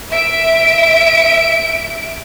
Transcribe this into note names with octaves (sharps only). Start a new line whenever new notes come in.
E5 D7